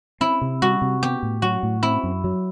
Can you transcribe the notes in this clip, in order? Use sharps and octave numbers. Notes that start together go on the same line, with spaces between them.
C4 E4
C3
G3 F#4
C3
B3 G4
A2
F#3 F#4
A2
C4 E4
F#2
F#3